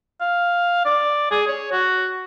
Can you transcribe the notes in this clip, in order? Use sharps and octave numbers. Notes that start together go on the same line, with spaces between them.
F5
D5
G#4
C#5
F#4